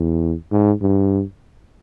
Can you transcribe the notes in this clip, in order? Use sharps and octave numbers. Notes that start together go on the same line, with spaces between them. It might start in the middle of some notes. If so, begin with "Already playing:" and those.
Already playing: E2
G#2
G2